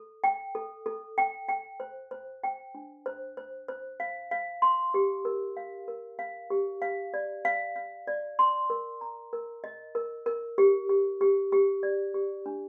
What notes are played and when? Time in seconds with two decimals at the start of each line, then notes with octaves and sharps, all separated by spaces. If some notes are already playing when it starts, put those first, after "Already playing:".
Already playing: A4
0.24 G5
0.55 A4
0.86 A4
1.18 G5
1.49 G5
1.80 C5
2.11 C5
2.44 G5
2.75 D4
3.06 C5
3.37 C5
3.68 C5
4.00 F5
4.31 F5
4.62 C6
4.94 G4
5.25 A#4
5.57 F5
5.88 A#4
6.19 F5
6.50 G4
6.82 F5
7.14 D5
7.45 F5
7.76 F5
8.07 D5
8.39 C6
8.70 A#4
9.01 A#5
9.33 A#4
9.64 D#5
9.95 A#4
10.26 A#4
10.58 G4
10.89 G4
11.21 G4
11.52 G4
11.83 D5
12.14 G4
12.46 D4